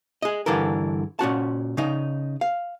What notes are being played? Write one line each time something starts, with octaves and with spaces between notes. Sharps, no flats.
G#4 D#5
G2 D3 E3 A4 A#4
A#2 C#4 F#4 A5
C#3 D#4
F5